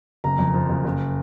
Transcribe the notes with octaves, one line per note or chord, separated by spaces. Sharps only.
F#1 A#5
F2
F3
F#1
F#1